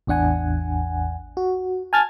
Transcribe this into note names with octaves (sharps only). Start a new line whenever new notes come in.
A1 E2 D4 F#5 G#5
F#4
G#5 A5 F6 G#6 A6